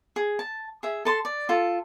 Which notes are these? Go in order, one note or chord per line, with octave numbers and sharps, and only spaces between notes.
G#4
A5
G#4 E5
A4 A5 C6
D5
F4 A4